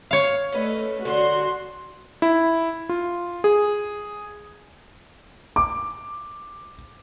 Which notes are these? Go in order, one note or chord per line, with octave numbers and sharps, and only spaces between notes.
C#5 F5
A3 C#4 B4 D#5
D3 C#4 F#4 C6
E4
F4
G#4
D6